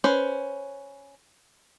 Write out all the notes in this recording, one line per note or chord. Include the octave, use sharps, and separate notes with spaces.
C#4 B4 C5